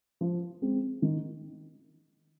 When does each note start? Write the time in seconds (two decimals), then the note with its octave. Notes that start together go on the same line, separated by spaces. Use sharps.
0.21 F3
0.62 G#3 C4
1.02 D#3